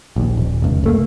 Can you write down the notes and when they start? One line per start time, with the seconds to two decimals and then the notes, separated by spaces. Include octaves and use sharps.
0.16 A#1 D#2
0.37 D#1
0.62 F1 C#2
0.84 F1 A3 A#3